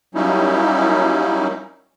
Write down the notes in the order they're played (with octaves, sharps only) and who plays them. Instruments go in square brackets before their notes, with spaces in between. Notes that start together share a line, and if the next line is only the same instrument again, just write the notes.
[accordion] F#3 G3 A#3 C#4 D#4 E4